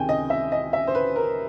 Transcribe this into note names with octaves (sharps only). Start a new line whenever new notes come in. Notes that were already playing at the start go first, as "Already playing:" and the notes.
Already playing: C#2 C3 D#3 G#3 G5 G#5
D#5
E5
D#5
E5
C5
B4
A#4